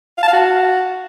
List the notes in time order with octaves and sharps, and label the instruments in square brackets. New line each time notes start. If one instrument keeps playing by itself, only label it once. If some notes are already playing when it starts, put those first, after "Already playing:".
[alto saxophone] F5
A5
F5
F#4